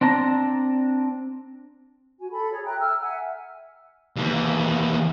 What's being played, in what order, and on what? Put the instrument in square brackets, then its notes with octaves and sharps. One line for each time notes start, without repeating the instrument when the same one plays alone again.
[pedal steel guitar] C4 D4 A5 A#5
[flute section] F#4 G#5
A4 B5
G#4 C#5
E5 G5 A#5 F#6
E6 F6
E5 F#5 G#5
[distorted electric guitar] D#2 E3